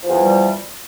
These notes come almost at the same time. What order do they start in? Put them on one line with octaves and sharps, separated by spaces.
F3 E2 E3 G3